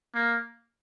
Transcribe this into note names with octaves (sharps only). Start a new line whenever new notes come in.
A#3